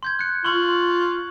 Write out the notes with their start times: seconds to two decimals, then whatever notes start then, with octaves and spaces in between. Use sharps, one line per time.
0.03 C6 G6 G#6
0.19 F#6 C#7
0.44 F4 C6 C#6 F#7